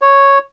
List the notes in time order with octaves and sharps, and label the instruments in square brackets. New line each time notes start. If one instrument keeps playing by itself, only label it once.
[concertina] C#5